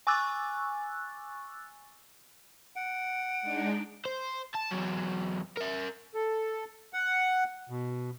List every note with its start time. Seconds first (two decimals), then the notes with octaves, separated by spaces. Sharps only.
0.07 G#5 C#6 D6 E6 F#6 A6
2.76 F#5 D7
3.42 G#3 D4 D#4
4.05 C5
4.55 A5
4.71 E2 F#3
5.57 A#4 E5
6.14 A4
6.93 F#5
7.70 B2